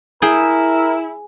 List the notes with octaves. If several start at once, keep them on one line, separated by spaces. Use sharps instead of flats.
E4 G#4 A#4 G5